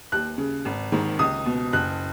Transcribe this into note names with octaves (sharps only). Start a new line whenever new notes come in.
D#2 F#6
C#3
G#1
G#2 D#3
C#2 D#6
B2
F#1 F#6